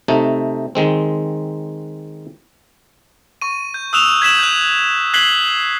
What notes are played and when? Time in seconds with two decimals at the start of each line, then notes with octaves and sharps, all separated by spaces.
0.08 C3 A3 D#4
0.75 D#3 G#3 C4
3.42 C#6 D#7
3.74 G6
3.93 D#6 E6 F#6 E7 F7 G7
4.22 G#6 B6 E7 F#7
4.39 F#6 G6
5.14 F#6 G#6 B6 C7 F#7 G7